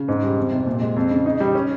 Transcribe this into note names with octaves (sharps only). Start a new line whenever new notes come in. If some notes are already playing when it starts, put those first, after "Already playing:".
Already playing: C#3
G#2
G3
F2
C3
A#2
G#3
F2
C#3
D#4
G3
C#4